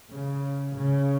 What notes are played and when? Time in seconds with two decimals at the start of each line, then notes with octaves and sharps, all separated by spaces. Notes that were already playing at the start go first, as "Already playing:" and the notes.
0.13 C#3
0.76 C#3